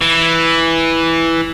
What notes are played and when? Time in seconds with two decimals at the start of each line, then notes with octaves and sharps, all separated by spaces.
0.01 E3